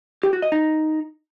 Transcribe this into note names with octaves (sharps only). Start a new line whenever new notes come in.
G4
F#4
D#5
D#4